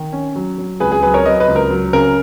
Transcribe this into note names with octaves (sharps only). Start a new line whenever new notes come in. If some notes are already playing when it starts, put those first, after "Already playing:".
Already playing: D#3
C#4
F#3
F#3
C#2 G#4 B4
G#4
F#3 G#4 B4
A#4 C#5
F#3 B4 D#5
B4 D#5
C#2
A#4
F#3
C#3 A#4